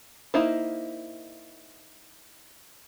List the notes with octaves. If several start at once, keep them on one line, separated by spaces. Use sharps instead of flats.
A#3 D#4 E4 C5